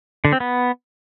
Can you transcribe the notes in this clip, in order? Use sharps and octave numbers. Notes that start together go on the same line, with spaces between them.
D3
C4
B3